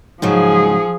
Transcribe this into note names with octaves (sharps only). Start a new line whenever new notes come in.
G#2 C#3 F3 F#3 G#4